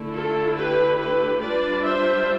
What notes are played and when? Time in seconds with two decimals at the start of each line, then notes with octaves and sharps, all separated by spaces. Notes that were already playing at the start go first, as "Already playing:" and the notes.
Already playing: D3 A3 E4
0.12 F4 A4
0.54 G4 B4
0.97 G4 B4
1.40 G3 D4 F4 B4 D5
1.83 C5 E5